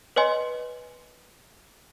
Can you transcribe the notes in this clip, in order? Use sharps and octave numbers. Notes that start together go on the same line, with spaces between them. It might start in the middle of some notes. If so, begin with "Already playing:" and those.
B4 C#5 D#5 G#5 C6